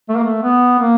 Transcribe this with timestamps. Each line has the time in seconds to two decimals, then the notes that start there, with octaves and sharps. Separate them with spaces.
0.09 A3
0.16 A#3
0.24 A3
0.43 B3
0.79 A#3